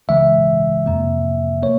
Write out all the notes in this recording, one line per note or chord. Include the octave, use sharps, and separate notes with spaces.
C#2 C#3 E3 G#3 E5
F2 C3 F3 A#3
A#3 C#5